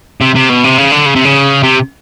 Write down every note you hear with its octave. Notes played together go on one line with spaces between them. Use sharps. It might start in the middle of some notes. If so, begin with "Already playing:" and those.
C3
C3
B2
C3
C#3
D3
C#3
C3
C#3
C3